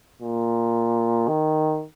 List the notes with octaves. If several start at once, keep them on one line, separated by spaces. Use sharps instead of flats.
A#2
D#3